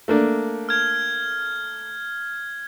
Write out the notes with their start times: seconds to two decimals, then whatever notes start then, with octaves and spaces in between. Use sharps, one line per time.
0.08 A3 A#3 D4
0.69 F6 G#6